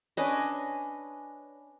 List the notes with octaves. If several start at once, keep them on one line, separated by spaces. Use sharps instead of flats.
C#4 D4 B4 D#5